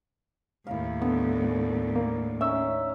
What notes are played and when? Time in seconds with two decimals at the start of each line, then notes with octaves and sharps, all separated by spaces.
0.67 D#2 A2 E4 F5
1.02 D3 B3 A4
1.96 A#3
2.41 C#4 D#4 E5 E6